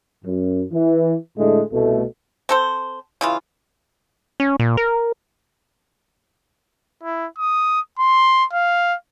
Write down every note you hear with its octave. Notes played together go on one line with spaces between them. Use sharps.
F#2
E3
A2 D3 G#3 A3
C2 B2 A3
C4 A4 C5
C#3 E3 F4
C#4
A#2
A#4
E4
D#6
C6
F5